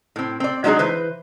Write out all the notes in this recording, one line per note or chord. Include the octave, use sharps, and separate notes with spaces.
A2 C4
C4 D5
F#3 G#3 D4 D#4 G#4
E3 B4 C5